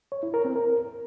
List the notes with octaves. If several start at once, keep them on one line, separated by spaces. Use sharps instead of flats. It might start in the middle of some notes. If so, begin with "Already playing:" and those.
C#5
E4
A#4
C4
A#4